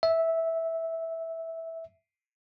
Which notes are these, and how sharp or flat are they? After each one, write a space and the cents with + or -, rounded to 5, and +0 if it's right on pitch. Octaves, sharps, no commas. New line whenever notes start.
E5 -10